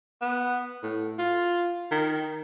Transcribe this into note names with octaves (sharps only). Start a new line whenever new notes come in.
B3
A2
F4
D#3